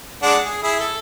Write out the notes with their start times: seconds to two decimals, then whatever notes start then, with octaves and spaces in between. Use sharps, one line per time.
0.23 G#3 D4 F#5
0.45 G#4
0.63 E4 G#4
0.80 A4